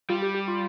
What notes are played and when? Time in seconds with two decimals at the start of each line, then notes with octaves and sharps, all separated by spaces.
0.09 G3 F4
0.22 G4
0.34 G4
0.48 F4